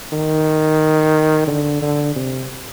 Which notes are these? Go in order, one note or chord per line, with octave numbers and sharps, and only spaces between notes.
D#3
D3
D3
C3